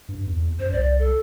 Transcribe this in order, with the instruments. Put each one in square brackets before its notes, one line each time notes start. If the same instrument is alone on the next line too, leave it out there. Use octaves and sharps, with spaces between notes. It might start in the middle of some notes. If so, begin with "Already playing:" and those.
[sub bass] G2
E2
[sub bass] F#2 [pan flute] C5
[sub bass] C2 [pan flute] D5
[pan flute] A4